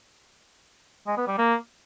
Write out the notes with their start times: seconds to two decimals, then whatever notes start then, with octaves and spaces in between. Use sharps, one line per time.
1.07 G#3
1.17 B3
1.28 G3
1.38 A#3